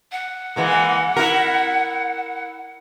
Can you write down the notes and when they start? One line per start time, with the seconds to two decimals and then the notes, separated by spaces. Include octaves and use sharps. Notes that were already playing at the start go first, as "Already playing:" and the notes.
0.12 F#5
0.56 E3 G#3 A#3
1.16 E4 A#4